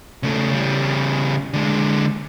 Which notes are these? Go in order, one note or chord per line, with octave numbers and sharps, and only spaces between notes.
C#3 A3
C#3 G3
D3 G#3